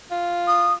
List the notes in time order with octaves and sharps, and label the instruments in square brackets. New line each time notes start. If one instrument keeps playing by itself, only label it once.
[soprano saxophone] F4
[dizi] D#6